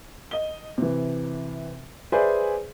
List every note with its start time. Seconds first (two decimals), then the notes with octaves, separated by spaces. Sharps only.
0.31 D#5 G7
0.78 C3 E3
2.12 G#4 B4 C5 D5 E5 G#5